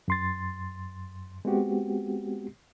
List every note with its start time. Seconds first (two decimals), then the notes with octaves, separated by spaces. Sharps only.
0.08 F#2 C6 A6
1.45 G#3 B3 C4 F#4 G4